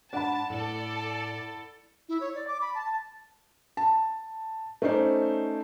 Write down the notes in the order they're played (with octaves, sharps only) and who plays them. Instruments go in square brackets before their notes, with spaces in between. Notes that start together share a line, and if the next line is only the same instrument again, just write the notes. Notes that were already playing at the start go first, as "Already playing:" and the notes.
[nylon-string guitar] G#2 D4 D5 [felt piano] F#5 B5 [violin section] A5
[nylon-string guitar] A2 [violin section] A4 D5
[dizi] E4
C#5
D5
D6
B5
A5
[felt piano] A5
A3 C#4 D#4 C5 D5